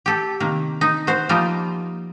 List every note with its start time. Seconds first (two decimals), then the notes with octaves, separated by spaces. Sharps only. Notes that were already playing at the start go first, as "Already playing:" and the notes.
0.06 G4 A4
0.40 C3 D#3 A#3
0.81 D#4
1.07 F#4 C5
1.29 F3 G3 A#3 D#4 F4